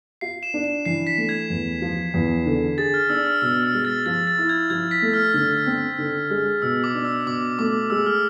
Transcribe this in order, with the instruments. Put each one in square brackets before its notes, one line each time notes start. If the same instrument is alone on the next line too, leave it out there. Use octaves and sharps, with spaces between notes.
[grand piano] F4 [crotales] C7
[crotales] E7
[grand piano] D4
[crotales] E7
[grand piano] E3 [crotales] C7
[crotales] B6
[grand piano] A3
[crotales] G#6
[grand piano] E2
F3
E2
D3
[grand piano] G#4 [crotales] A6
[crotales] F6
[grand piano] D4 [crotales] E6
[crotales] F6
[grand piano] B2 [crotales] E6
[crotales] F6
[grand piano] G#3
[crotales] A6
[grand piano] F3 [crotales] A6
[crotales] A6
[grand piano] E4
[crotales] G#6
[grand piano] F3 [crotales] G#6
[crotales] B6
[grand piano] A3
[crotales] F6
[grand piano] D3
C4
D3
G#3
[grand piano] B2 [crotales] E6
[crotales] D6
[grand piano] D4
[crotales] E6
[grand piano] B2 [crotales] D6
[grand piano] A3 [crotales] D6
[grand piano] G#3 [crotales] E6
[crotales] F6